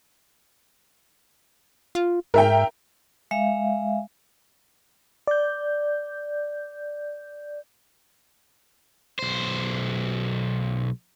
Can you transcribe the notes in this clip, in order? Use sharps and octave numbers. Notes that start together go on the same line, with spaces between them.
F4
G#2 A#4 E5 G5
G#3 E5 F5
D5 G6
B1 C5